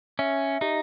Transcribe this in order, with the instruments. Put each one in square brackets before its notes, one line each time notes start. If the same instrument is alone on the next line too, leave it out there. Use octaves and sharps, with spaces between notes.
[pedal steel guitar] C#4 [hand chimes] E5
[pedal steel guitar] D#4 [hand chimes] G4